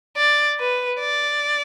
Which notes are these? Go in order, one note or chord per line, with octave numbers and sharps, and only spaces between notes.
D5
B4
D5